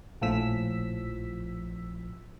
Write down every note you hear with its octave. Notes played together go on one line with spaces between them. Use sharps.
A#1 A2 F3 E6 B6